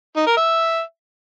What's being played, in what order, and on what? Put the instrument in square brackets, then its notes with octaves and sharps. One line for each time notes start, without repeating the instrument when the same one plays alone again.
[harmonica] D#4
A#4
E5